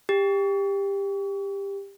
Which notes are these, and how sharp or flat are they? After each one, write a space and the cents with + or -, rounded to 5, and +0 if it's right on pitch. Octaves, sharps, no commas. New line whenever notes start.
G4 +20